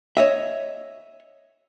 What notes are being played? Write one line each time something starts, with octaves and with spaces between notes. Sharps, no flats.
C#5 D#5 E5